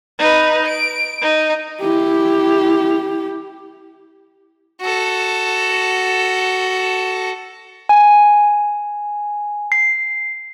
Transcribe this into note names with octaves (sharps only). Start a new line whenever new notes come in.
D#4 B4
D7
D#4
E4 G4
F#4 A4
G#5
C7